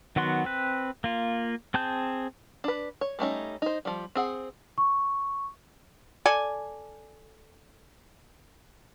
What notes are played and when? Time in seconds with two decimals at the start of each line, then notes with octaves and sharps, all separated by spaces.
0.16 D#3 F#3 B3 F#4 C6
0.45 C4 B4
1.04 A#3 F4
1.74 C4 G#4 A5 G6
2.64 D4 B4
3.01 C#5
3.19 G3 A3 C#4 D#4
3.62 D#4 C5
3.85 F3 G3
4.15 C4 G#4 F#5
4.78 C#6
6.26 A4 D5 G#5